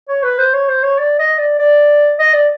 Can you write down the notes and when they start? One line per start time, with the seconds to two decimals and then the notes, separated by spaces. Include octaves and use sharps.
0.09 C#5
0.23 B4
0.38 C5
0.54 C#5
0.69 C5
0.83 C#5
0.98 D5
1.19 D#5
1.38 D5
1.59 D5
2.19 D#5
2.34 D5